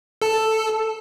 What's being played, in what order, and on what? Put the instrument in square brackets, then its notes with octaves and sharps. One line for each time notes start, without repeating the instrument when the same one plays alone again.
[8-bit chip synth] A4 A5